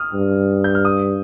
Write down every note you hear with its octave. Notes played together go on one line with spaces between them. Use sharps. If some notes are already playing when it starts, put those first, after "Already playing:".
Already playing: D#6 F6
G2
G6
F6
D#6